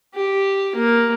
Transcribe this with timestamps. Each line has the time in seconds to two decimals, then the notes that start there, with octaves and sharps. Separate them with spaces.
0.14 G4
0.75 A#3